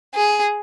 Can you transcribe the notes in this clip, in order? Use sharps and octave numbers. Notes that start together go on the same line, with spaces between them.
G#4